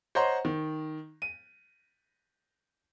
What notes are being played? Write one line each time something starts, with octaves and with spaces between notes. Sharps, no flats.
C5 C#5 D#5 F#5 A#5 C6
D#3
D#7